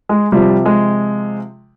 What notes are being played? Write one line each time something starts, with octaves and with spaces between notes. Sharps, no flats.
G#3
C3 F3 G3
G#3